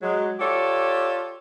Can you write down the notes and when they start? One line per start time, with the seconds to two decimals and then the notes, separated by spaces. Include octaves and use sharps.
0.02 F#3 G#3
0.39 F4 G4 A4 C#5 D5